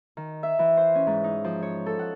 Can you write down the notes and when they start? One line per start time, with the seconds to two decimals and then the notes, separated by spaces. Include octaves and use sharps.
0.17 D#3
0.43 E5
0.59 E3
0.77 C5
0.95 C#4
1.07 G#2
1.24 D#4
1.44 F3
1.62 C#5
1.86 A4
1.99 F#5